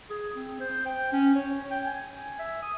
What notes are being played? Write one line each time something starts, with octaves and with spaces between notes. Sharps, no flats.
G#4
C4
C5
G5
C#4
C#5
G5
G#5
E5
D#6